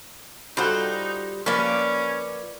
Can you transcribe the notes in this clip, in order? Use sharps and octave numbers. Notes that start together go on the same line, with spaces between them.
G3 D#4 F4 F#4 A4 C5
F3 A#3 C#4 B4 D5